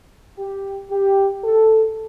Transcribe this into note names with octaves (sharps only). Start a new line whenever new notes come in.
G4
G4
A4